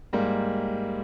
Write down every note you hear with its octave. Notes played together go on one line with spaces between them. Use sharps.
G#2 G3 A#3